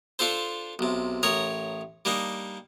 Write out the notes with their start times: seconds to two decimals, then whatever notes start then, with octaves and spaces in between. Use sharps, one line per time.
0.19 D4 F4 A4 C5
0.79 B1 C3
1.23 A1 A#4 C#5 A#5 D#6
2.05 G3 A#3 D4 D#4